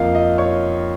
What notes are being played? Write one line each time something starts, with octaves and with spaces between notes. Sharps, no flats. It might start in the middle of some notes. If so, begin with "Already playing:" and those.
Already playing: F2 F3 A#3 D#5 F5
D#5
C#5